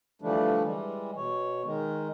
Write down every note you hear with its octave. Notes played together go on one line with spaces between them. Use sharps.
D3 E3 F3 G3 A3 D4
E3 G3 G#3
B2 C#5
D#3 G#3